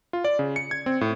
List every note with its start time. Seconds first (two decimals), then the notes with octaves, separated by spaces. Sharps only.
0.13 F4
0.24 D5
0.39 C#3
0.56 C#7
0.71 G#6
0.86 C4
1.01 A2